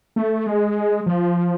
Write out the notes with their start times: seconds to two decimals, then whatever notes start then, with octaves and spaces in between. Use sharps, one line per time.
0.16 A3
0.46 G#3
1.06 F3